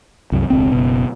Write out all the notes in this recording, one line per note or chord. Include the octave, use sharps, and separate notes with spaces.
C2 F#2
E1 C#2 C4
F#1 B2